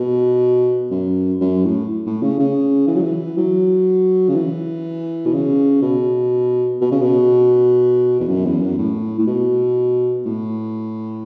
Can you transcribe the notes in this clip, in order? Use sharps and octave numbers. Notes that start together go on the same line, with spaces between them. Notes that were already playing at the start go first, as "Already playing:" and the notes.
Already playing: B2
F#2
F#2
A2
A2
C#3
C#3
E3
F#3
E3
F#3
C#3
E3
B2
C#3
B2
B2
C#3
B2
E2
F#2
E2
F#2
A2
A2
B2
A2